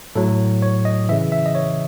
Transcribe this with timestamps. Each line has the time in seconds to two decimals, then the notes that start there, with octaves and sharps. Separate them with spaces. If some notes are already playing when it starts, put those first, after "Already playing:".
0.16 A2 F#3 A4
0.62 C#5
0.85 D#5
1.09 C#3 E3 E5
1.32 E5
1.46 D#5
1.55 C#5